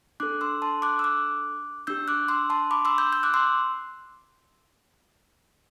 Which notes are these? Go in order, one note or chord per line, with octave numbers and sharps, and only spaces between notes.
D4 A4 D6 F#6
C6 E6
A5 C6
D6 F#6
E6
D6 F#6
D4 G4 E6 G6
D6 F#6
C6 E6
A5 C6
B5 D6
C6 E6
E6 G6
E6 G6
D6 F#6
C6 E6